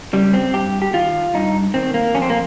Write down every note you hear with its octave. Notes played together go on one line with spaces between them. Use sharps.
C#3 G3
C4
G2 G4
G4
D#3 F4
G2 D#4
D#3 C4
A#3
F2 C#4
C4
A#3